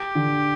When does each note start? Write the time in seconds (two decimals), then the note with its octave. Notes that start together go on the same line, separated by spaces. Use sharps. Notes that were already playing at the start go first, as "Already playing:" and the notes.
Already playing: G4
0.15 D3